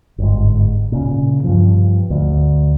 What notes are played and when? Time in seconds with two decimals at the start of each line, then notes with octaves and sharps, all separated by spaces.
0.18 G1 G#2
0.92 A#2 C#3
1.44 G2 F3
2.10 D2